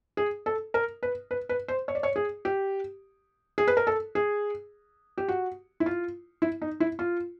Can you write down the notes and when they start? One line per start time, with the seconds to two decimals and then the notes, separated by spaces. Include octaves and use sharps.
0.17 G#4
0.46 A4
0.74 A#4
1.03 B4
1.31 B4
1.49 B4
1.68 C5
1.88 C#5
1.95 D5
2.03 C#5
2.16 G#4
2.45 G4
3.58 G#4
3.67 B4
3.77 A#4
3.87 A4
4.15 G#4
5.18 G4
5.28 F#4
5.80 E4
5.86 F4
6.42 E4
6.62 D#4
6.80 E4
6.99 F4